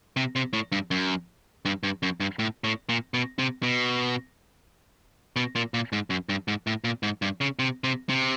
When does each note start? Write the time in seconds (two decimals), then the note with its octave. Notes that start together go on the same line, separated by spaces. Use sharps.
0.17 C3
0.36 C3
0.53 A2
0.72 G2
0.91 F#2
1.65 G2
1.83 G2
2.03 F#2
2.20 G2
2.39 A2
2.64 A2
2.89 A#2
3.14 B2
3.39 C3
3.63 B2
5.36 B2
5.55 A#2
5.74 A#2
5.93 G#2
6.10 F#2
6.29 G2
6.48 G#2
6.67 A2
6.84 A#2
7.03 G#2
7.22 G2
7.41 C#3
7.59 C3
7.84 C3
8.09 C3